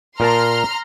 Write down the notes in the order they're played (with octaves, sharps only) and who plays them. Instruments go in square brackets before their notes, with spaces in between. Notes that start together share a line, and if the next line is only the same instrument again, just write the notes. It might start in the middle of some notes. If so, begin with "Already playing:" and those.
[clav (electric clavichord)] A#2 A#4 A5 [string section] A#5 C6 F6